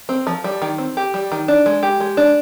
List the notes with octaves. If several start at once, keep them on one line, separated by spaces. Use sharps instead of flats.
C4
F3
G3
D#3
C4
G4
G3
D#3
D4
G#3
G4
G#3
D4